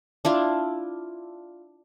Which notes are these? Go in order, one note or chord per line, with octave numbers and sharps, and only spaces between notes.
D4 E4 F4